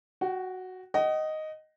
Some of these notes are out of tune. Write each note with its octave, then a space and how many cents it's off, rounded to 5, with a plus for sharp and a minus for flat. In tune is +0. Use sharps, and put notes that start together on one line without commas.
F#4 +0 G5 -35
D#5 +0 F#5 +40